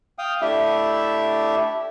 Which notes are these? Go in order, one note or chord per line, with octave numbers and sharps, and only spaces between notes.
F5 G5 D#6
A3 D4 E4 G4 E5